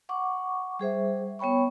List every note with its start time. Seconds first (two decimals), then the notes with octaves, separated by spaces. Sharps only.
0.09 F#5 C#6 D6
0.79 G3 G#4 C5 E5
1.39 B3 C#5 G5 B5 C#6